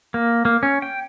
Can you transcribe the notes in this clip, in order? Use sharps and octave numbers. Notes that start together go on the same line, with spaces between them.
A#3
A#3
C#4
G5